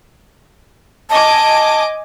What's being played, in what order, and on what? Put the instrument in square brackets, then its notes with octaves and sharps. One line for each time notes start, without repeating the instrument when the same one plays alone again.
[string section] D#5 G#5 D6 [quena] A5